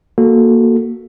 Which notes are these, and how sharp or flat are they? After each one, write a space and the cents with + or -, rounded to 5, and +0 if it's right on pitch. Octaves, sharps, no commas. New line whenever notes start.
A#3 +0 F#4 +0 A4 +0